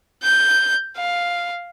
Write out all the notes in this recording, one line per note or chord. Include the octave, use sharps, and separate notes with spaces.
G6
F5